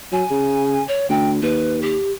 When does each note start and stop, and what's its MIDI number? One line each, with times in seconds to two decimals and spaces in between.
0.12 0.24 54
0.12 0.84 80
0.31 0.80 49
0.88 1.08 73
1.10 1.37 38
1.10 1.30 79
1.42 1.96 39
1.42 1.80 71
1.82 2.11 67